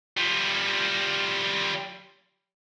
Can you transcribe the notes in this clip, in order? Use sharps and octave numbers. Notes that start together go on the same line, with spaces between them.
G3 F4